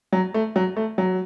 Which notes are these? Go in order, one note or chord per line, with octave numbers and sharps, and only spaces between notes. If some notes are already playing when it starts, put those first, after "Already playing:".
F#3
A3
F#3
A3
F#3